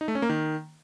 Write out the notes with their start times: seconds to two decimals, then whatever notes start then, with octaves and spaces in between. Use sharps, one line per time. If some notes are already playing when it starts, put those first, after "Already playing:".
0.01 D#4
0.08 A3
0.15 C#4
0.22 A#3
0.29 D#3